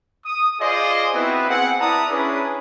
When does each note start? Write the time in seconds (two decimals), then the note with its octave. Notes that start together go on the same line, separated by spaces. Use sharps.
0.25 D#6
0.61 F4 G#4 C5 D5 D#5 C6
1.14 B3 C4 E4 F#4 B4
1.50 C4 G#4 F#5
1.80 E4 B4 D5 A5 A#5 D#6
2.11 C#4 D4 E4 G#4 B4